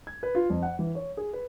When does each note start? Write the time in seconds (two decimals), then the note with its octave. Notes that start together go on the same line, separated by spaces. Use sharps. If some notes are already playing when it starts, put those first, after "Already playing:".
0.07 G#6
0.23 B4
0.35 F4
0.50 F2
0.63 F#5
0.79 E3
0.95 C#5
1.17 G#4
1.33 B4